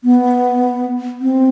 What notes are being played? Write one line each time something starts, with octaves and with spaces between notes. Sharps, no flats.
B3
C4